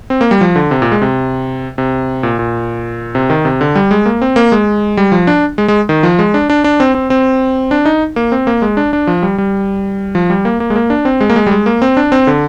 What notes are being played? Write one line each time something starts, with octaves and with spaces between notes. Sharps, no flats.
C4
A#3
G3
F3
D3
C3
A#2
G#3
C3
C3
A#2
A#2
C3
D#3
C3
D3
G3
G#3
A#3
C4
A#3
G#3
G3
F3
D4
G#3
G#3
D#3
F3
G#3
D4
D4
D4
C4
C4
C4
D4
D#4
A#3
C4
A#3
G#3
D4
D4
F3
G3
G3
F3
G3
A#3
A#3
G#3
A#3
D4
C4
G#3
A#3
G#3
G3
G#3
A#3
C4
D4
C4
D3